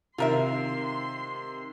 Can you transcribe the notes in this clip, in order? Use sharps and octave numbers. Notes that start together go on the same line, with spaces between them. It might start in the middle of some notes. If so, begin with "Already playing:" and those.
C3 D#3 F4 A#4 E5 C6